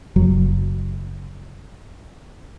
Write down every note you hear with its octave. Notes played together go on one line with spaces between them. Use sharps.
F#1 F#3